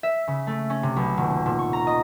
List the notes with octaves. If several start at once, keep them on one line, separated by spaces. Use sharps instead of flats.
E5
C#3
A3
C#4
C3
B1
D#1
A#2
C#6
A#5
D#5